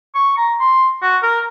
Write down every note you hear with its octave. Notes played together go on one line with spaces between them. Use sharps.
C#6
A#5
C6
F#4
A#4